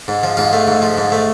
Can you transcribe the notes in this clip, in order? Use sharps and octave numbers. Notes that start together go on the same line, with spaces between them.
G#2
F3
G#2 F4
A3
G#2
F3
G#2
A3